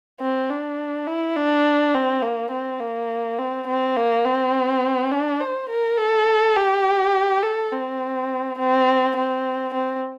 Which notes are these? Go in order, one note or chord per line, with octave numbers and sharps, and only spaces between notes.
C4
D4
E4
D4
C4
A#3
C4
A#3
C4
C4
A#3
C4
D4
C5
A#4
A4
G4
A4
C4
C4
C4
C4